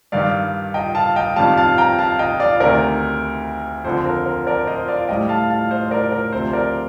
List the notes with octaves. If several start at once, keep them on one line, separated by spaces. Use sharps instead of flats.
G2 D#3 G3 D5 F5
D#5 G5
F5 A5
D#5 G5
F2 D#3 G3 F5 A5
F5 A5
G5 A#5
F5 A5
D#5 G5
D5 F5
D2 C3 D#3 A#4 D5
F2 D3 F3 C5
A#4
A#4
A#4 D5
C5 D#5
D5 F5
A2 G3 D#5 G5
F5 A5
F5 A5
C5 D#5
A#4 D5
A#4
D2 C3 F3 C5
A#4 D5